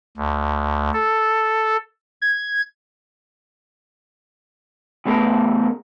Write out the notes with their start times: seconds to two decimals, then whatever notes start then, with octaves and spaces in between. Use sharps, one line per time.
0.17 D2
0.94 A4
2.22 G#6
5.06 C#3 A3 B3 G#4 A#4